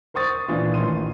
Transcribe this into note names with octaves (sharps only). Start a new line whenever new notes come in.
A#4 C5 C#6 D#6 A6
A#2 E3 D4 F4
A1 D#3 C6 D#7